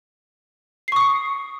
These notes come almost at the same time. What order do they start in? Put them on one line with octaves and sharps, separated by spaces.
C7 C#6 D#6 C#7